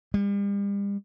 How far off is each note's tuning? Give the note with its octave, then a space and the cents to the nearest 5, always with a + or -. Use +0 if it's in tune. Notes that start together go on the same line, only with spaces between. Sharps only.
G3 +40